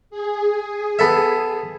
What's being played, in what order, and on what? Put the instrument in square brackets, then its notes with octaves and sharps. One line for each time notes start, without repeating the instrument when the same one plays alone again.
[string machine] G#4
[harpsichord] B3 A4 E5